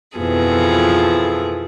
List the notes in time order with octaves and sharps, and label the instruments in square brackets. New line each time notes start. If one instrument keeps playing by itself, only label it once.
[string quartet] F2 B2 E3 F3 G#4 A4